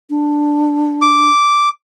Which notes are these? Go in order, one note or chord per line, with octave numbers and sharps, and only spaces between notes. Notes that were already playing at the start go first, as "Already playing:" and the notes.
D4
D6